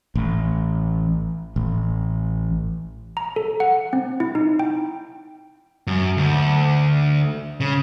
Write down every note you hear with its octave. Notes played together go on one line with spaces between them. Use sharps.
A1
A1
A#5
A4
F#5
C4
E4
D#4
G5
F#2
D2
C#3